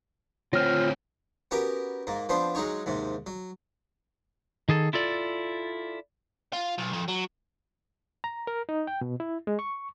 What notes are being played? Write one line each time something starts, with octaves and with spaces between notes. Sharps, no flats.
D2 C4 F4 C#5 F6
B3 C#4 F#4 G4 A#4
G#2 A#3
F3 B3 C4 D4 C5
F#3 G#3 D#4 C#5
D#2 G#2 C3
F#3
D#3 G#4 A4
E4 F4 A4 D5
F4
B1
F2
F#3
A#5
A#4
D#4
G5
B2
E4
G#3
C#6